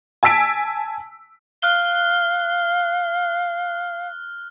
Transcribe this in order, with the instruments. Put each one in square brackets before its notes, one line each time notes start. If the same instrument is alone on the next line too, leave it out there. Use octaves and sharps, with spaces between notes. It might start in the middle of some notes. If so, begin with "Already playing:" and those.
[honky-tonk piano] G#5 A5 E6 B6 D7
[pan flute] F5 [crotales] F6 F#6 G7